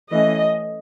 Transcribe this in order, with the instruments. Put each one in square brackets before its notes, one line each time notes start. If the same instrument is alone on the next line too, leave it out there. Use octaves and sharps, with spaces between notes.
[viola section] E3 A3 C#4 D#5